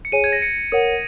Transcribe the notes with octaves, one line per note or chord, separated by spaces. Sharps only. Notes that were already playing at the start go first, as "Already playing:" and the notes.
C#7
G#4 C#5 G#5 D#7
G#6
A#6
C#7
A#4 C#5 F#5 D#6